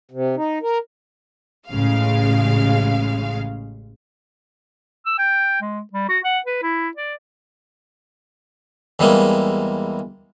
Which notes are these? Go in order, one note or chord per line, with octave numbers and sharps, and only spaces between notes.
C3
D#4
A#4
A1 C#3 G#3 F5
E6
G5
G#3
G3
F#4
F#5
B4
E4
D5
E2 E3 G3 G#3 A#3